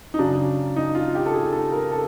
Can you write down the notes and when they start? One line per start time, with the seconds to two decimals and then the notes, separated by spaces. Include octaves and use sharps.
0.14 D#4
0.19 F#2 C#3 F#3 D4
0.76 D#4
0.95 F4
1.15 G4
1.26 A4
1.34 G#4
1.53 A4
1.72 A#4
1.92 A4